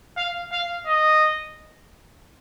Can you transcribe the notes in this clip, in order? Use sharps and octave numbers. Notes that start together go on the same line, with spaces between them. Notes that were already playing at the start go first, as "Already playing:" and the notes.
F5
F5
D#5